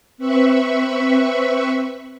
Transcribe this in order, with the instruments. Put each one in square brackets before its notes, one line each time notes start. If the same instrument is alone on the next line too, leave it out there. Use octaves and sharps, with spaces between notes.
[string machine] C4 B4 E5 B5 C#6